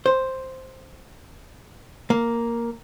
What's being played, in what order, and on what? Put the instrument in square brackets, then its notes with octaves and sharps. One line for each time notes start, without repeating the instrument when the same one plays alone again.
[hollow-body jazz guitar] C5
A#3